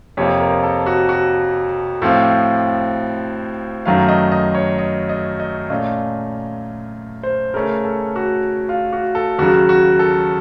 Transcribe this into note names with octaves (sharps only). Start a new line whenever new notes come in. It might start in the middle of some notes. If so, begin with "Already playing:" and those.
F2 C3 F3 A#3 F4 C#5
A#4
A4
F#4
F#4
A2 F3 C4 F4
F#2 D#3 F#3 A3 F5
D#5
D#5
C#5
D#5
D#5
D#5
A#2 A3 C#4 F4 D#5
C5
C#3 A3 C#4 A#4
A4
F#4
F4
F#4
A4
D#2 C#3 F#3 F#4
F#4
A4